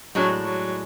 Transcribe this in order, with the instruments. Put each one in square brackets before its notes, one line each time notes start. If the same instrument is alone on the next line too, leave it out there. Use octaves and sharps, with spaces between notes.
[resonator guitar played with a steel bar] A2 G#3 D4 [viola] F#3
[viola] F#3